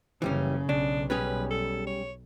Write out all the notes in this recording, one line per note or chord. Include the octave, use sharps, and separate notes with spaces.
F#1 C#3 E3 G3 C#4
B1 C#3 D4
G3 C#4 G#4 B4
A4
C#5